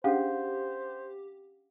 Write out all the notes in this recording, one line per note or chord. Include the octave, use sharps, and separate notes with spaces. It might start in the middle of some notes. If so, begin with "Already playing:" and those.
C#4 D4 G4 G#4 C5 F5 F#5